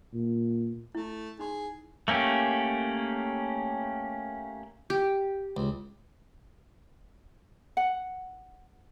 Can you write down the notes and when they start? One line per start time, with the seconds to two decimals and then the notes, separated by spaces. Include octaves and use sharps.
0.14 A#2
0.95 A3 E4
1.39 D#4 G#4 C6
2.08 A3 A#3 C#4 G4
4.90 G4
5.57 C#2
7.77 F#5